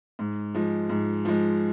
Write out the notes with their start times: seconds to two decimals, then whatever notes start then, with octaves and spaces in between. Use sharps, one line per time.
0.19 G#2
0.55 F3 G#3
0.89 G#2
1.25 F3 G#3